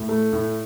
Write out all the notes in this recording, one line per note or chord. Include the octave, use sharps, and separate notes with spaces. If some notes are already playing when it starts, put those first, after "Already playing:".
Already playing: A2
A3
A2